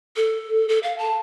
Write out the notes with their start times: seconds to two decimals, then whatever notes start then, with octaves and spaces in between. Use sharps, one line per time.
0.16 A4
0.69 A4
0.83 F5
0.98 A5